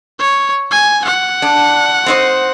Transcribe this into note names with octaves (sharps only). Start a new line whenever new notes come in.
C#5
G#5
F#5
D4
C4 D#4 C5